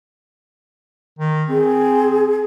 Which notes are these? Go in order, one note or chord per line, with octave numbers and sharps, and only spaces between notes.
D#3
C4 G#4